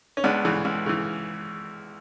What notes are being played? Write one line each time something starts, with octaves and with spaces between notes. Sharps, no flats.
C#4
C#2 B3 D4
C#3 E3
C#2
C#3 E3